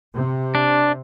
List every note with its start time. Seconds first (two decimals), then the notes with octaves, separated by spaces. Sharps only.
0.14 C3
0.55 D4